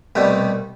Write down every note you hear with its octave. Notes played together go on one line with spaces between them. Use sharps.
C2 B2 G3 A3